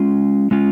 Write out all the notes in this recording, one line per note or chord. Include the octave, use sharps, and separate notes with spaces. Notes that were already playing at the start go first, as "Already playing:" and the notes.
Already playing: G#3 C#4 F4
G#3 C#4 F4